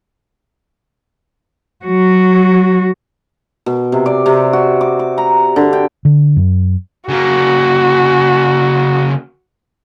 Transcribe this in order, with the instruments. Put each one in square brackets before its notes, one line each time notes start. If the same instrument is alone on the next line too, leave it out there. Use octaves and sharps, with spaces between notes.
[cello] F#3 F#4
[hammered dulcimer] B2
C3
D5
C3
F#4
D6
D6
A#5
D3
G5
[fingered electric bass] D3
F#2
[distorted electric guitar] C#3 A#3 [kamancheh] F#4